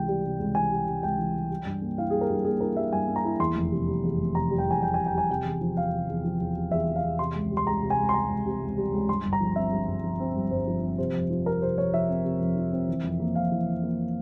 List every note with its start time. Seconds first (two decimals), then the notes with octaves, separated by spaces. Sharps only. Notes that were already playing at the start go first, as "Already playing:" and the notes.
Already playing: C#2 C3 E3 G5
0.08 G3
0.24 C3
0.39 C#2
0.55 E3 G#5
0.71 G3
0.87 C3
1.03 C#2 G5
1.18 E3
1.34 G3
1.50 G3
1.66 G2
1.82 A#3
1.98 E4 F5
2.10 G3 G#4
2.21 A#4
2.30 G2
2.44 A#3 G#4
2.61 E4 A#4
2.76 G3 E5
2.93 G2 G#5
3.08 A#3
3.16 A#5
3.24 E4
3.39 E2 C6
3.55 F1
3.71 C3
3.88 G3
4.03 E2
4.19 F1
4.35 C3 A#5
4.51 G3
4.58 G5
4.66 E2 G#5
4.82 F1 G5
4.94 C3 G#5
5.06 G5
5.14 G3 G#5
5.29 C3 G5
5.45 E2
5.61 F3
5.77 E2 F5
5.93 C3
6.09 E2
6.24 F3
6.41 E2
6.55 C3
6.71 E2 E5
6.88 F3
6.96 F5
7.03 E2
7.19 C3 C6
7.35 C#2
7.51 G3
7.57 C6
7.67 C#2 A#5
7.82 C3
7.90 G#5
7.98 C#2
8.09 C6
8.14 G3 A#5
8.29 C#2
8.46 C3
8.61 C#2
8.77 G3
8.93 C#2
9.09 G2 C6
9.25 G1
9.33 A#5
9.40 F3
9.56 C4 E5
9.72 G2
9.88 G1
10.04 F3
10.20 C4
10.36 G2
10.51 G1 C5
10.67 F3
10.83 C4
10.98 C3 C5
11.14 F2
11.30 F3
11.46 C4 A#4
11.62 C3 C5
11.78 F2 C#5
11.93 F3 E5
12.09 C4
12.25 C3
12.41 F2
12.56 F3
12.72 C4
12.88 E3
13.04 F2
13.20 A#3
13.35 F2 F5
13.51 E3
13.67 F2
13.83 A#3